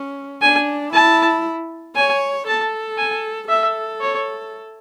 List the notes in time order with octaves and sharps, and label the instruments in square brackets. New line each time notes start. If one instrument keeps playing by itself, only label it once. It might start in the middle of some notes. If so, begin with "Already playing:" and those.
Already playing: [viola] C#4
[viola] D4 [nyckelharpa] G#5
[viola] E4 [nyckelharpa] A5
[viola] C#5 [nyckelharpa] G#5
[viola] A4 [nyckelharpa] A5
[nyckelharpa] G#5
[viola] A4 [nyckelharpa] E5
[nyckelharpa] C#5